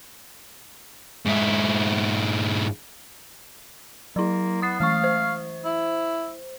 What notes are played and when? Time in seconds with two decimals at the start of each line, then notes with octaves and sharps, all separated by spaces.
1.26 G#2 E4
4.16 F#3 A#3 E4
4.62 B3 D#6 A6 C7
4.80 E3 A3 F5 C#6
5.04 C5
5.65 E4